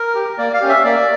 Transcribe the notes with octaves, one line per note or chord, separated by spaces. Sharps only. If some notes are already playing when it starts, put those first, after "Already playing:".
Already playing: A#4
G4
A#3 D5
F5
C#4 G4
E5
A#3 D5